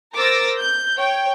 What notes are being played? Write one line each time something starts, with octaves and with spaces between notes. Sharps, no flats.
A#4 C5 D6 E6 A6 A#6
G6
C#5 G5